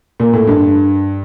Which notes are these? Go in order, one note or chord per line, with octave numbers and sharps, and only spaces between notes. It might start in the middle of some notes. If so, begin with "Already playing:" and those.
A#2
A2
G2